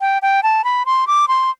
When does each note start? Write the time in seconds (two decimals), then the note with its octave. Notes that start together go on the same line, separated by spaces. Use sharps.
0.01 G5
0.22 G5
0.43 A5
0.64 B5
0.86 C6
1.07 D6
1.28 C6